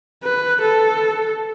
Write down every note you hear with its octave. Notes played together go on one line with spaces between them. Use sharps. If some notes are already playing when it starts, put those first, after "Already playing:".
B4
A4